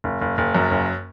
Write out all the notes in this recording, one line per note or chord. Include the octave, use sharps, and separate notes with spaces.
F#1
F#1
F#1
F#2
F#1